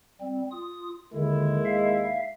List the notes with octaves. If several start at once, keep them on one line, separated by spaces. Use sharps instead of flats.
G3 C4
F4 D#6
D#2 D3 D#3 G#3 E4
E5 F5